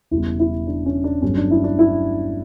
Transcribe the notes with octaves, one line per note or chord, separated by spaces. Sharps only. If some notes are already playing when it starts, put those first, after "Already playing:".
E1 E2 C#3 G3 E4
E4
D4
C#4
D4
G1 G2 F#3 A3 C#4
D4
E4
D4
E4